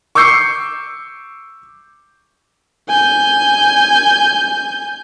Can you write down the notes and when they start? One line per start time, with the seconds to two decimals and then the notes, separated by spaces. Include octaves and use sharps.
0.15 C#6 D6 E6 G6 C7 C#7
2.89 G#5 G6